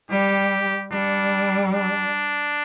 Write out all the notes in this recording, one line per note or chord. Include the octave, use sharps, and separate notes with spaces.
G3 G4
G3 D4
D4